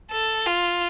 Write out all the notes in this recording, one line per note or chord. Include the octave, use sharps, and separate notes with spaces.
A4
F4